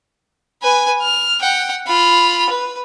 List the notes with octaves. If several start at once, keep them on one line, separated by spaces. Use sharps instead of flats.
B4 G#5
F6
F#5 G5
F4 B5
B4